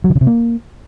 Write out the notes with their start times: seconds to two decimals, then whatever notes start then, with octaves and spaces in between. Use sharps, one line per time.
0.04 F#3
0.10 D3
0.15 C#3
0.21 C3
0.27 A#3